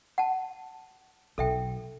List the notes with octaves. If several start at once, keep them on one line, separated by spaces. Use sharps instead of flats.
F#5 A5
B1 A4 E5 G5